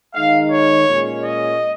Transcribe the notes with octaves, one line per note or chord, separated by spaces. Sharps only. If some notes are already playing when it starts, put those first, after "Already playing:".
D#3 G#3 D#4 F5
C#5
A#2 G#3 C#4
D#5